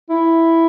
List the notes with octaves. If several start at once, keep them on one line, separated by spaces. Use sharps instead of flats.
E4